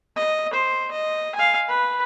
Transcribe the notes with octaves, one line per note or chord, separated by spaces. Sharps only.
D#5
C5
D#5
F5 G#5
B4